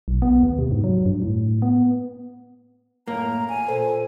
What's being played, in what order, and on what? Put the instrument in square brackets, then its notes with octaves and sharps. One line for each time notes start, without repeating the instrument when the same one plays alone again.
[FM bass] B1
B3
D#2
C3
G#2
F#3
G2
A2
B3
[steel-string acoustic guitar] F#2 A2 [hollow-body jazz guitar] A#3 [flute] A#5
[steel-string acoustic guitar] E2 [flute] G#5
[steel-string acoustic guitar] A#2 A4 C5